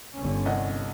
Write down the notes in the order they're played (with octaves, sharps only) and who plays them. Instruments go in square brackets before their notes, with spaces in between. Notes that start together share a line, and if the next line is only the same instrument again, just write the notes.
[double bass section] G1 D3 C#4
[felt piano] C2 D#5 F#5